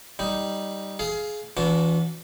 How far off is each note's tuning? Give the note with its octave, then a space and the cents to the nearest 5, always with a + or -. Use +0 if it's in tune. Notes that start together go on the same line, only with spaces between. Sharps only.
G3 -5 D#4 +0
G#4 +20 F5 -5
E3 +10 D4 -35 F#4 -30